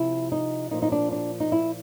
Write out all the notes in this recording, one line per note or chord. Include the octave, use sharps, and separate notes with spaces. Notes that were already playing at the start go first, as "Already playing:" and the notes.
Already playing: C3 F3 E4
D#4
A#2 F3 D#4
D#4
D4
D4
D#4
E4